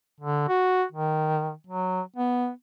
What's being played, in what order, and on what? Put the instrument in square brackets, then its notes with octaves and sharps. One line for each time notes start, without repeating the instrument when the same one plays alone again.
[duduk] D3
F#4
D#3
F#3
B3